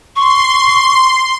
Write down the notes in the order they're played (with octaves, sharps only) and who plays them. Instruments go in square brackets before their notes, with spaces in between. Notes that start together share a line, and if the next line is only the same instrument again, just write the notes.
[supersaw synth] C6 [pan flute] C#6